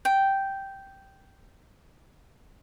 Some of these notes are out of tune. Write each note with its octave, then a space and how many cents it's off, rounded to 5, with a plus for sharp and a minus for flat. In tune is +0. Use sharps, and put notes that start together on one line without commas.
G5 -5